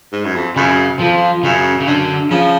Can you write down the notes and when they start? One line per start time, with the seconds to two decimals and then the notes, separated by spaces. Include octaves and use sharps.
0.12 G#2
0.25 F#2
0.35 F2
0.56 F#2 C#3
0.99 F2 F3
1.43 F#2 C#3
1.80 C#3
1.87 F#2 D3
2.31 C#3 F3